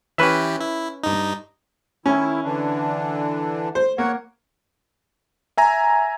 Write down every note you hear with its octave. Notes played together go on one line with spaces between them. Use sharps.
E3 C#4 G4 B4 E5
E4
G2 D#4
D#3 C#4 E4
D3 E3 D4
C5
A#3 C#5 F#5
E5 G#5 A#5